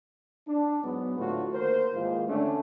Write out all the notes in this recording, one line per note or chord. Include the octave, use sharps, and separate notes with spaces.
D4
G#2 F#3 B3
D2 A2 F4 F#4
D#2 A#4 C5
D#2 G#2 E3 F4
D3 A3 C#4 D4